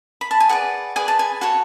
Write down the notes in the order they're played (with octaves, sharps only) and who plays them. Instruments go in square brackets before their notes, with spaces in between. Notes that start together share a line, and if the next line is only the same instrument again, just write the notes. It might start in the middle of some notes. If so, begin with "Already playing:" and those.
[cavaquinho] B5
A5
G#5
G#4 B4 D5 F#5
G#4 B4 D5 G#5
A5
G#5
F#4 A4 C#5 F#5